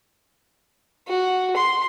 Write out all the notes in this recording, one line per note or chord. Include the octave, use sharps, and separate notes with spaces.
F#4
C6